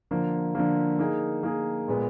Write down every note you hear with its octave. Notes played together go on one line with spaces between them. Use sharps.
D3 F3 A#3
D3 F3 A#3
A#3 D#4 G#4
A#3 D#4 G#4
A#2 G#3 B3